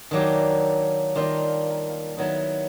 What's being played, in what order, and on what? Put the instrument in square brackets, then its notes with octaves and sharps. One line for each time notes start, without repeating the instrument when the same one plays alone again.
[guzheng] D#3 F#3 A#3 D4 G4
D#3 G3 A#3 D4 F4
D#3 F#3 B3 E4